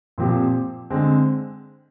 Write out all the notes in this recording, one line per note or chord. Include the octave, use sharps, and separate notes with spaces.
A#2 F3 C4 G4
D3 G#3 C4